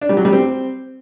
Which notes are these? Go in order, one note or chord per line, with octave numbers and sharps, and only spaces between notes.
D4
G3
F#3
G3
C4